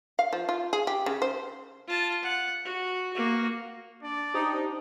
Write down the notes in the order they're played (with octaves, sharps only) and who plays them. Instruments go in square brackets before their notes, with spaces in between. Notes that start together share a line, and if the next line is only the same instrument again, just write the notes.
[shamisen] F5
F3
F4
G#4
G4
C#3
C5
[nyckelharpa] F4 A5
F#5
F#4
A#3 F#4
[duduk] D4 [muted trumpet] D5
[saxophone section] D#4 [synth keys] G4 C5 D#6